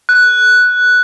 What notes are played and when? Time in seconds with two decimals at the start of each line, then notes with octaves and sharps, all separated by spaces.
0.09 F#6